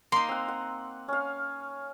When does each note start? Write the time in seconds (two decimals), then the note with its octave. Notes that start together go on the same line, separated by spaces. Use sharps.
0.12 A#3 D#4 C6
0.29 C4 F#5
0.48 F#5
1.08 C#4 F5